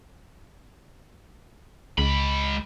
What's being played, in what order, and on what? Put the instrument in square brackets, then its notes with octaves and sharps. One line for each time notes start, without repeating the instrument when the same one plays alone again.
[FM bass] C#2 [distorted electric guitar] G#3 B5